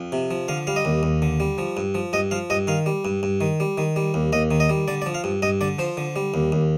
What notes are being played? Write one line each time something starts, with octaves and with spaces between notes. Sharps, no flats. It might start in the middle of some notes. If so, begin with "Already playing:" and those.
Already playing: F2
C3
F3
D3 F5
G3 F5
D#5
D#2
D#2
D3
G3
F3
G2
F3
G2 D#5
F3 F5
G2 D#5
D#3 F5
G3
G2
G2
D#3
G3
D#3
G3
D#2
D#2 D#5
D#3
D#5
G3
D3 D5
D5
F3
F5
G2
G2 D#5
D3 D5
F3 C5
D3
G3
D#2
D#2